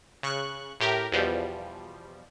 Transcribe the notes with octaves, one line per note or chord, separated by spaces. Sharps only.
C#3 C#6 F#6
A2 G4 A#4
E2 B2 F3 G3